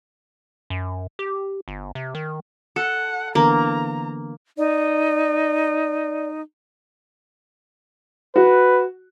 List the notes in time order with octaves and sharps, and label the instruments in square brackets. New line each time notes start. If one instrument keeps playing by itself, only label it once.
[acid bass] F#2
G4
G1
C3
D#3
[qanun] A4 [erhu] F#5
[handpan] D3 E3 B3 [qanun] A#3 [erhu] A#5
[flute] D#4 [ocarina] D5
[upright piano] F#4 [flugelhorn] B4